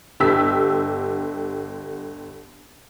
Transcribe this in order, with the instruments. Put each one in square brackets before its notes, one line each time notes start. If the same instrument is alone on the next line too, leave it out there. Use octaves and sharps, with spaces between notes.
[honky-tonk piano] G1 D3 G4 E6 B6